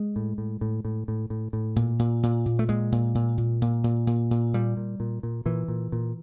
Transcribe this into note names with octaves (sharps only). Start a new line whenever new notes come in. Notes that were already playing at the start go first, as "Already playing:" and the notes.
Already playing: G#3
A2
A2
A2
A2
A2
A2
A2
A#2
A#2
A#2
A#2
A3
A#2 G#3
A#2
A#2
A#2
A#2
A#2
A#2
A#2
A#2 G3
A#2
A#2
A#2
A#2 E3
A#2
A#2